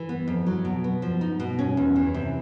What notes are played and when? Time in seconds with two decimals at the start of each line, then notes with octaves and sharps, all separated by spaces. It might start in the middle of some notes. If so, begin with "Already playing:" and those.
Already playing: E3
0.09 B3
0.28 F2
0.46 F#3
0.65 B2
0.84 B3
1.02 F3
1.21 D#4
1.40 B2
1.59 C#4
1.77 E2
1.96 E3
2.14 C3